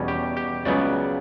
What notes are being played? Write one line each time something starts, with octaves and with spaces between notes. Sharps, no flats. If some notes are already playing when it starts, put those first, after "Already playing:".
Already playing: E2 B2 G3 C#4
G4
G4
C#2 C#3 F#3 B3 D5